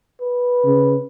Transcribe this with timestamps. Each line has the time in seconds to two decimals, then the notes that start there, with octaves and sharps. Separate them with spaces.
0.21 B4
0.65 C#3